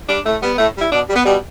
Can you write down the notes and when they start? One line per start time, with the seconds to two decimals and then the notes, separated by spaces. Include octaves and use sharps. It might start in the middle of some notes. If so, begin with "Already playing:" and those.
0.09 G3 D4
0.25 A2 A3
0.42 G3 B3
0.58 A2 A3
0.76 G3 E4
0.92 B2 D4
1.09 G3
1.14 B3
1.25 B2 G3